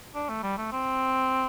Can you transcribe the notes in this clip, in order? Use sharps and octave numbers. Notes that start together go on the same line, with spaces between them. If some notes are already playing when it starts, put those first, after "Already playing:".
D4
A3
G3
A3
C4